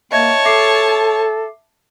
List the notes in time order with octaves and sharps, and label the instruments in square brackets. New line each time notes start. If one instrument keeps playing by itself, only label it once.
[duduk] A#3 [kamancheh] C#5 A5 [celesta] D#5 E5 G#6
[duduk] A4 [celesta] E5 D6 C7